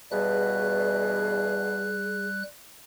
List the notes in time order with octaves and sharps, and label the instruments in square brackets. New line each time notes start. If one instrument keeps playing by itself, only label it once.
[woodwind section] E2 G2 B2 [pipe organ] G3 F#6 [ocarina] G#4